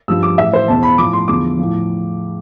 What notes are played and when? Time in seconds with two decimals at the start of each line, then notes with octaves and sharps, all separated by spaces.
0.08 G2 F3 E6
0.23 D6
0.38 A2 E3 E5
0.53 C5
0.68 E2 B2 A5
0.83 B5
0.98 A2 F3 D6
1.13 C6
1.28 E2 D3 F3 D6
1.59 A2 F3